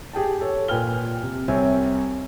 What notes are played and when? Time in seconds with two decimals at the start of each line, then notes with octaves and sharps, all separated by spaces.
0.13 G4 G#4 G5 A5
0.41 A4 C#5
0.68 A#2 B4 G5 G#5 F6 G7
1.23 C3
1.48 C2 C4 C#5 E5 G#5